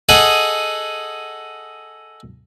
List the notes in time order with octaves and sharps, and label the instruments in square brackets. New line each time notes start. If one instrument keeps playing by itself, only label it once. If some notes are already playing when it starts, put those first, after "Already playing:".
[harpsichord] G#4 A4 D#5 F#5